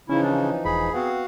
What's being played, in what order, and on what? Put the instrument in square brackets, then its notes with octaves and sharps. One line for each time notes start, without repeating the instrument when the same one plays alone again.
[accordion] C#3 [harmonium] E3 F3 D#4 [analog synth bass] C#4 [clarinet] E4
[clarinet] D4
[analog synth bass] E1 [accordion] G#4 [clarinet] B5
[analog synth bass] B3 [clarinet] C4 [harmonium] F#4 F5 F#5